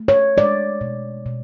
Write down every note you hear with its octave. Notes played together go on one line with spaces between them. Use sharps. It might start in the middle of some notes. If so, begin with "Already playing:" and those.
Already playing: A3
C#5
G#3 D5
B2
B2